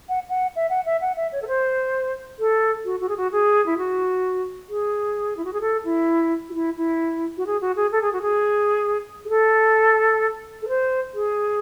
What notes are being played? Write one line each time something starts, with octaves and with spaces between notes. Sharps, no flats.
F#5
F#5
E5
F#5
E5
F#5
E5
C#5
A4
C5
A4
F#4
F#4
G#4
F#4
G#4
E4
F#4
G#4
E4
F#4
G#4
A4
E4
F#4
E4
E4
F#4
G#4
F#4
G#4
A4
G#4
F#4
G#4
G#4
A4
A4
C5
G#4